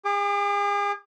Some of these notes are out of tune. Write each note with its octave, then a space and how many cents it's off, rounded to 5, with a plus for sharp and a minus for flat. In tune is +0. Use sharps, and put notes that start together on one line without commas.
G#4 -40 D6 +25